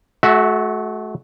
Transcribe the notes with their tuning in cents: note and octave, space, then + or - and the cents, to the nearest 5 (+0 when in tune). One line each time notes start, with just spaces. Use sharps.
A3 -35 F#4 +0 E5 +0